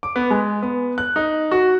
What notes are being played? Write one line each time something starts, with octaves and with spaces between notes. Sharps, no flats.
D6
B3
G#3
B3
F#6
D#4
F#4